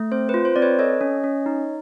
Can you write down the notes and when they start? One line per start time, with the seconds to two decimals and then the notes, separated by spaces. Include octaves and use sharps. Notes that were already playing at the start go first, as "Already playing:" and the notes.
Already playing: A3
0.12 C4 C5
0.29 F4 B4
0.45 C5
0.56 C4 D5
0.62 B4 C#5
0.79 A4 C#5 D#5
1.01 C#4
1.24 C#4
1.46 D#4